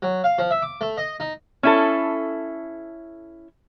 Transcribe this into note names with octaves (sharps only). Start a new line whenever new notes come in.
F#3
F5
F3
E5
D6
A3
D#5
D#4
C#4 E4 A4